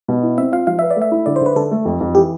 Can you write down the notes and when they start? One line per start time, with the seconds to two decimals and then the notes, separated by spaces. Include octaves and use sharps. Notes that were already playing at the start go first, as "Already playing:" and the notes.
0.08 B2
0.23 E4
0.38 C4 E5
0.52 F4 F5
0.67 F3 F5
0.79 B4 E5
0.91 D5
0.96 A3
1.02 E5
1.12 E4
1.26 D3 D5
1.36 C5
1.41 D3 B4
1.56 D3 A4
1.71 A3
1.85 F2
2.01 F2
2.15 E3 G4